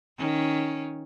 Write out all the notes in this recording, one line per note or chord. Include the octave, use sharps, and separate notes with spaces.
D#3 C#4